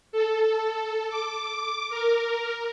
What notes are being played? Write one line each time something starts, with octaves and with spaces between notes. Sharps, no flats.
A4
D6
A#4